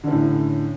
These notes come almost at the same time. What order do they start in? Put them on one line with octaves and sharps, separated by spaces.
D3 C#4 A2